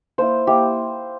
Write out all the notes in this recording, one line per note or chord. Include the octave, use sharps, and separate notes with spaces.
A#3 E4 C5
A#3 E4 G4